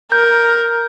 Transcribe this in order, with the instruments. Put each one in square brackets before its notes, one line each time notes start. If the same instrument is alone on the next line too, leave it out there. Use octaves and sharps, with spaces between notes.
[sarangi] A#4 [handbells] G6